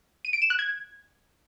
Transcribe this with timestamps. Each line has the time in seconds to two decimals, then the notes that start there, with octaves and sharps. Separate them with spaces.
0.25 D#7
0.33 D7
0.42 E7
0.50 F#6
0.59 G#6